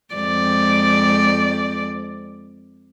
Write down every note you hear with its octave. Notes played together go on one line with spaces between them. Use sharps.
F2 G#3 D5